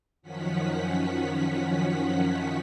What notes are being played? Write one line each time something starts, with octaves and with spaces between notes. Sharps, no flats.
F#2 D#3 F3 C#4 F#5 B6